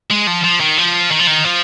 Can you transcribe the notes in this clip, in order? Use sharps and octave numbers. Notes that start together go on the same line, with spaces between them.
G#3
F3
F3
D#3
F3
D#3
F3
D#3
F3